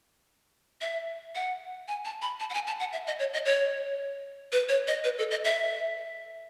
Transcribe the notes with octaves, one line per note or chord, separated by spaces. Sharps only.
E5
F#5
G#5
A5
B5
A5
F#5
G#5
A5
F#5
E5
D#5
C#5
D#5
C#5
B4
C#5
D#5
B4
A4
D#5
E5